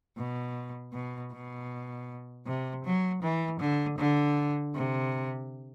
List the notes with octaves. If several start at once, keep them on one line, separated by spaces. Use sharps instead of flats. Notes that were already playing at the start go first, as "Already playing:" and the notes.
B2
B2
B2
C3
F#3
E3
D3
D3
C3